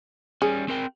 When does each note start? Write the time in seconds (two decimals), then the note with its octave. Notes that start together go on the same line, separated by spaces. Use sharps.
0.42 G3 C#4 G#4
0.68 C4 A#4 G5